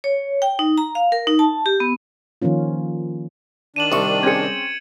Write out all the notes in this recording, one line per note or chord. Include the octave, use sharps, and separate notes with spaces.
C#5
G5
D#4
A#5
F5
A#4
D#4
A5
G4
B3
D#3 F3 A#3 C#4 F4
D#3 D4 D#7 E7 F#7
C2 C#6
C4 C#4 G#4 G#6 C#7